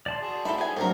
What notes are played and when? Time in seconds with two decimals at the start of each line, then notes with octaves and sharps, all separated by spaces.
0.06 D5 A5 C6
0.22 F#4 G#4
0.45 E4 A4 B5
0.58 B3 G#5
0.76 A2 D3 F#3 C4 A#4